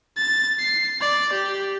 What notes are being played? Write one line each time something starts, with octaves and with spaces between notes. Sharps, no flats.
A6
C7
D5
G4